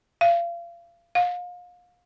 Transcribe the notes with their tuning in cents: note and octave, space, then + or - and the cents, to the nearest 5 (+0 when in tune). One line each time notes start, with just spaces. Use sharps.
F5 -35
F5 +35